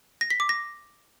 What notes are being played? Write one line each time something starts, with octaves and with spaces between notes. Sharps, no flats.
A#6
B6
D6
A#6